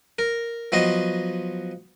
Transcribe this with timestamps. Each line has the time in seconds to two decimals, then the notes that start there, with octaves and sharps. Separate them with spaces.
0.19 A#4
0.72 F3 F#3 B3 D#5 C6